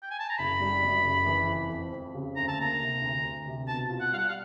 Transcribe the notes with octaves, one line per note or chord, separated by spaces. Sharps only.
G5
G#5
A5
A#5
F#1 B5
G3
F#2
F#1
E3
F2
F2
F2
C#3
D2 A#5
A5
A#3 A#5
C3
D2
D2
C3
B2 A5
F4
F#5
G3 F5
F#5
F5